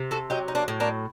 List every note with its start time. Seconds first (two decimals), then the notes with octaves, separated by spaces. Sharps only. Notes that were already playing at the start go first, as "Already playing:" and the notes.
Already playing: C3
0.11 F#4 A4
0.30 F#3 D#4 G4
0.48 D#4
0.55 A#3 D4
0.68 A2
0.80 A#3 D4